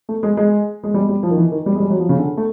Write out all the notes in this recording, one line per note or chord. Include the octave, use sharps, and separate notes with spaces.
A3
G#3
G#3
G#3
G3
G3
F3
D#3
E3
D#3
G3
G#3
G3
F#3
F3
C#3
D3
A3